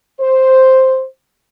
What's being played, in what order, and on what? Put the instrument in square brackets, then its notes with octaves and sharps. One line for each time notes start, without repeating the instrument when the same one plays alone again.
[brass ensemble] C5